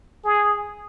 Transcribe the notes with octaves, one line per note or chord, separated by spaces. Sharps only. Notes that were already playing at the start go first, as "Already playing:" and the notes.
G#4